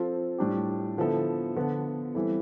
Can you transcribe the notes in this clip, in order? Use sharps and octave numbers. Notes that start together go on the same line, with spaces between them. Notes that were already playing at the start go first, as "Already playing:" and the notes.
Already playing: F3 C4 F4 A4
A2 G3 D4 G4
D3 F3 B3 E4 A4
D3 F3 B3
E3 G3 C4 E4 A4